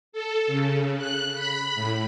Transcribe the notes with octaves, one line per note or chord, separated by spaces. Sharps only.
A4
C#3
F#6
B5
A2